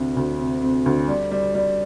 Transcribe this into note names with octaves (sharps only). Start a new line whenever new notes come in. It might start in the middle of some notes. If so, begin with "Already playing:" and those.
Already playing: D2 C3
D2
C3
C3
D2
G3
G3
G3